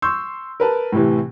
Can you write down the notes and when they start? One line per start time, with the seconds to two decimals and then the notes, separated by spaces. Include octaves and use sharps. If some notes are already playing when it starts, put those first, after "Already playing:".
0.02 C6 C#6 E6 G6
0.60 A#4 B4 A5
0.92 A2 C3 E3